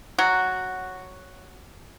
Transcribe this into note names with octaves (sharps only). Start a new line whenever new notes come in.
F#3 F#4